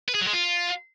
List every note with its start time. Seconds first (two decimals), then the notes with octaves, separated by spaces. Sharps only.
0.08 B4
0.14 G#4
0.21 F#3
0.27 G#3
0.33 F4